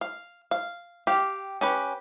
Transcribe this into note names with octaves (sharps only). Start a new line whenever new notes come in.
F5
F5
G4 F5
C#4 G4 B4